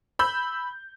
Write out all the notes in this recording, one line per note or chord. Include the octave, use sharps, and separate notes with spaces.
B5 E6 G6